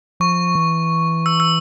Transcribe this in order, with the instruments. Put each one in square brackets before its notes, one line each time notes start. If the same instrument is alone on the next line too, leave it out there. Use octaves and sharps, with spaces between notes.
[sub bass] F3 [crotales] C#6
[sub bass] E3
[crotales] E6
E6